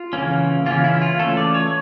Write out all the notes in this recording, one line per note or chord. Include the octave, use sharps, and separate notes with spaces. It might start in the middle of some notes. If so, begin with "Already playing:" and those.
Already playing: F4
C#3 E3 A#3 C#4
C#3 E3 A#3 C#4 F4
E4
F4
E3 A3 C#4 A4
D5
C#5